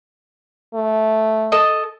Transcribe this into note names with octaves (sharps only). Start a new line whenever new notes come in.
A3
A4 D#5